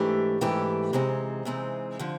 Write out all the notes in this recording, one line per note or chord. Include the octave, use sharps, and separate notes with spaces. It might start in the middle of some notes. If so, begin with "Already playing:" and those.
Already playing: G#2 E3 A3 D4 G4
G#2 E3 A3 D4 G4
C3 E3 G#3 C4 D#4
C3 E3 G#3 C4 D#4
D3 F3